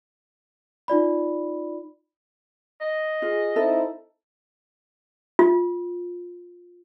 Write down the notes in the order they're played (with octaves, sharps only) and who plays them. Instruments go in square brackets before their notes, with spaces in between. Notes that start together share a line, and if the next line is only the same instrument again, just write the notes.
[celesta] D#4 F4 D5 B5
[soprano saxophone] D#5
[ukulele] F4 [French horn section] G#4
[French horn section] C4 D#4 [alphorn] E4 [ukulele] A4
[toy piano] F4